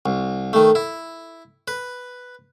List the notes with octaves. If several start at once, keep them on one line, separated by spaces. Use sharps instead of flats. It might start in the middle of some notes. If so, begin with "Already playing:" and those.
C2
D#3 A3
E4
B4